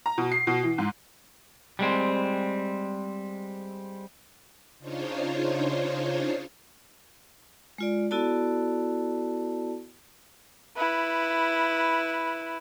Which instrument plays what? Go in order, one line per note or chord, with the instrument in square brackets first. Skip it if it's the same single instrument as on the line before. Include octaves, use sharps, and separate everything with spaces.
[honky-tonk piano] A#5
B2
C7
B2
E3
G#2
[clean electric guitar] G3 G#3 C4
[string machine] C#3 D4 D#4 F4 C5 C#5
[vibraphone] G#3 F4 D5
B3 E4 F#4 A4 D5 A5
[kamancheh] E4 B4